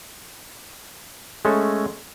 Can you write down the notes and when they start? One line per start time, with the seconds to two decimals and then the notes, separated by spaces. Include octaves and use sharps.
1.45 G#3 A3 C#4 A4